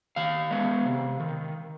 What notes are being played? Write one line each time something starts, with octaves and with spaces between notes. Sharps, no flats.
D#3 F5
G#3 B3
C3
D#3